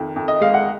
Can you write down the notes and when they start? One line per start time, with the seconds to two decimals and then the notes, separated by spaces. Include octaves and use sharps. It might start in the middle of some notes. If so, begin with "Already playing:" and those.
Already playing: F2 D#3
0.16 F2
0.28 D#5
0.41 G#3 F5
0.54 F#5